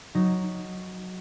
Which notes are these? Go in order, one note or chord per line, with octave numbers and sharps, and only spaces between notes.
F#3 D#4 A#6